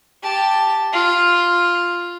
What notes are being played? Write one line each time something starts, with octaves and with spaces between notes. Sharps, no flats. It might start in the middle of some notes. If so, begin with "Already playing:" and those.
G4 A5
F4